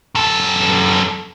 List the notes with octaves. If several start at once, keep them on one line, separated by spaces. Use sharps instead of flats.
F#2 A4